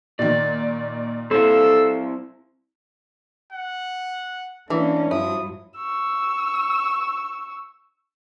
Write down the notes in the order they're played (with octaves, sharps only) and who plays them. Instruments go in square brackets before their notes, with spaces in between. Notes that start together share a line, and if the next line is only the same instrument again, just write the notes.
[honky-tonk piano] A#2 D#3 [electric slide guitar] D5
[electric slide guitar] C4 E4 [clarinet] A4 [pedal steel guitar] C5 F5
[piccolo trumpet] F#5
[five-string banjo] E3 [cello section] A#3 C#4 [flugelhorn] D4
[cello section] G2 F#3 [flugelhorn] F3 [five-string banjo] E4 [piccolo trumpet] D#6
[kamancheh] C#6 E6